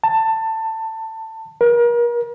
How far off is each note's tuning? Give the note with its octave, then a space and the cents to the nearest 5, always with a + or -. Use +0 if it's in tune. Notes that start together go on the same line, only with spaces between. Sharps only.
A5 +20
A#4 +35